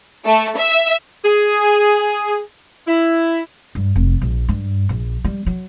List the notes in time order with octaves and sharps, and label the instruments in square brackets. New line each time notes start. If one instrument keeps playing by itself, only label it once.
[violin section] A3
E5
[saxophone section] G#4
E4
[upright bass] G2
F1
A#1
G2
A#1
G3
F#3